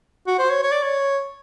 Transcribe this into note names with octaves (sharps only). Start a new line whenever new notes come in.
F#4
C5
C#5
C#5
D5
C#5